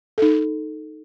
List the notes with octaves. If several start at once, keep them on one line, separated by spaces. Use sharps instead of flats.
D#4 A4